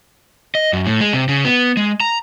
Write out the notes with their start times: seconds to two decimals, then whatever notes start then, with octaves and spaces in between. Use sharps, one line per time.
0.55 D#5
0.73 F#2
0.86 A2
1.00 G#3
1.13 C3
1.28 C#3
1.45 B3
1.77 G#3
2.00 A#5